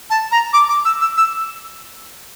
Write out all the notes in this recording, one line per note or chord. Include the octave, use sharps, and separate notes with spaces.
A5
A#5
D6
D6
E6
E6
E6